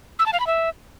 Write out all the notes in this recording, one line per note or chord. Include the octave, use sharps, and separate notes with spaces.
E6
A5
F5
B5
E5